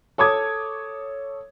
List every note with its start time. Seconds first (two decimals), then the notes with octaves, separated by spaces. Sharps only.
0.18 A4 C#5 D6 D#6 G#6